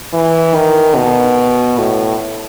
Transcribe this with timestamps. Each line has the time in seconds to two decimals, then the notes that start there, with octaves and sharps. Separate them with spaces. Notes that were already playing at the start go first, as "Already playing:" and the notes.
0.13 E3
0.55 D#3
0.96 B2
1.78 A2